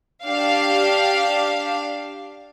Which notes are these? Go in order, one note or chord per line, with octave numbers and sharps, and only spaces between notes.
D4 G4 F5